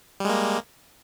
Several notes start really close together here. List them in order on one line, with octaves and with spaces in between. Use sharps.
G3 G#3 A#3